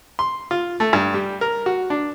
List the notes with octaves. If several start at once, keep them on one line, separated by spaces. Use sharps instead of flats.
C6
F4
A3
G2
G3
A#4
F#4
D4